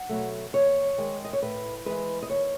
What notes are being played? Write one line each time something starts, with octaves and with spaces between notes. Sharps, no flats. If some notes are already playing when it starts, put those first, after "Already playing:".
Already playing: F#5
B2 F#3 A3
D#2 C#5
D#3 G#3
D#5
C#5
A2 B4
E3 G#3 B4
D#5
D#2 C#5